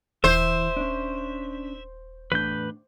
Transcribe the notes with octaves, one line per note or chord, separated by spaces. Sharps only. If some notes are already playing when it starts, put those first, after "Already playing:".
D#1 E3 C5 E5
C#4 D4
E2 A2 D4 B4 G6